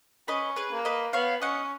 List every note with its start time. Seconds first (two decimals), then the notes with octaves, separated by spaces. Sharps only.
0.28 C#4 B4 D#5
0.56 G#4 B4
0.71 A#3
0.85 B4 D#5
1.13 B3 C#5 F5
1.42 C#4 D#5 F#5